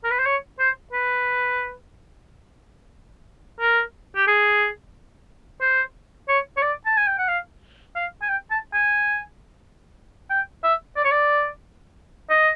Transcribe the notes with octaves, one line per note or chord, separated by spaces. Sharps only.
A#4
B4
C5
C#5
C5
B4
A#4
G4
G#4
C5
C#5
C#5
D5
A5
G#5
G5
F#5
F5
F5
G#5
G5
A5
G#5
G5
E5
D5
C#5
D5
D#5